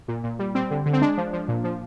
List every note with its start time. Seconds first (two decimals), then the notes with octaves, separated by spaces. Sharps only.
0.08 A#2
0.24 A#2
0.39 G3
0.55 G3 C4
0.71 D3
0.86 D3
0.93 C4
1.02 G#3 D4
1.17 F3
1.33 F3
1.48 A#2
1.64 F3